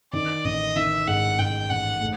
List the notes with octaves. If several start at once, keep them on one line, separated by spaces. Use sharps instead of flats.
D#3 D5
A1 D#5
D#3 E5
G#2 F#5
G#2 G5
A1 F#5
A3